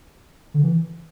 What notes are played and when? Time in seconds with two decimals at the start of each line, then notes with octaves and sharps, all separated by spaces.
0.54 D3
0.64 E3